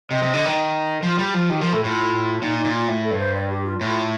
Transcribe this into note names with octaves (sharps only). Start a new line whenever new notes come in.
C3 D#5
C3
D3
D#3
F3 F4
G3 G4
F3 F4
D#3 G4
F3 A#4
A2 A4
A2 F4
A#2 D#4
D#4
A#2
F4
A2
A4
G2
C5
D5
G4
F4
A2 F4